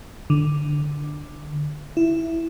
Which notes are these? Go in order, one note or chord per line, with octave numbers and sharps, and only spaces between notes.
D3
E4